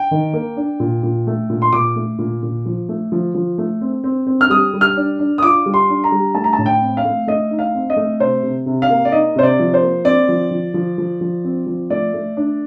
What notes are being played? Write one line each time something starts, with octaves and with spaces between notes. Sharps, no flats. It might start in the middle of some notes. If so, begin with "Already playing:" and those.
Already playing: G5
D#3
A#3
D4
A#2
A#2
A3
A#2
C6
A#2 D6
A3
A#2
A#2
F3
A3
F3
F3
A3
C4
C4
C4
F6
G3 D#6
G3
F6
D4
D4
D#6
F4 D6
G3
C6
D4
A#5
G3
A3 A5
A#5
A5
A2
G5
C4
F5
A3
A3 D#5
D#4
F5
C4
D#5
A3
C3 C5
C3
C3
F5
A#3
D5
D#4 D#5
C3 C5
D5
F3
C5
A#3
C4 D5
F3
F3
F3
F3
F3
C4
F3
A3 D5
A3
D4